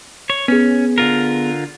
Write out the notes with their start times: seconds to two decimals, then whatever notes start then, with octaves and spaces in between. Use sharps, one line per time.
0.30 C#5
0.48 B3 C#4 G#4
0.98 D3 F4 A#4